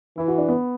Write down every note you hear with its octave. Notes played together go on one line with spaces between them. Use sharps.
E3 E4
F#4
D4
B3